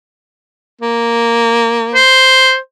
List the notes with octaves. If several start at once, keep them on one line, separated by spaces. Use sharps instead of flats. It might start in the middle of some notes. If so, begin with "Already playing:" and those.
A#3
C5